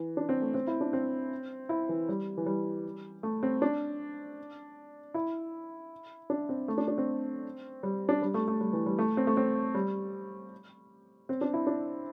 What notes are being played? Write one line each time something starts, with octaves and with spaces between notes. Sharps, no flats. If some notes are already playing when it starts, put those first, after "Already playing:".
Already playing: E3
D4
C4
A3
C4
E4
D4
C4
E4
E3
G3
E3
G3
A3
C4
D4
E4
D4
C4
A3
D4
D4
C4
G3
D4
G3
A3
A3
G3
E3
G3
A3
C4
A3
C4
G3
C4
D4
E4
D4